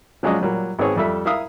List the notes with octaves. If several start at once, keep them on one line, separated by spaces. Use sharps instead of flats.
F3 F#3 G#3 C#4 D5 D#5
A#2 F#3 G3
G#1 B3 C4 G#4 C#5
F2 G3 A4 E5
E4 A#4 E5 F5 D#6